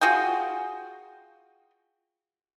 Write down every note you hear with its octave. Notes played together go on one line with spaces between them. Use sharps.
F4 F#4 G#4 G5